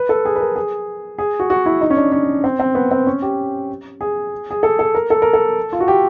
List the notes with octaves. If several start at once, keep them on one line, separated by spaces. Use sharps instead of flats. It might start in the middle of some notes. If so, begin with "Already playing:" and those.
Already playing: B4
A4
G#4
B4
A#4
G#4
G#4
F#4
F#4
E4
D#4
C#4
D4
C#4
C4
C4
B3
C4
C#4
G4
G#4
G#4
A4
A4
A#4
A4
A#4
A4
F4
F#4
G4